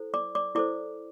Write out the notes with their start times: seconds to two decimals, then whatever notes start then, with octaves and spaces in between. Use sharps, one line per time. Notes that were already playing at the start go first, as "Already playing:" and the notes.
Already playing: E4 A4 C5
0.14 D5 D6
0.35 D5 D6
0.55 E4 A4 C5 D5 D6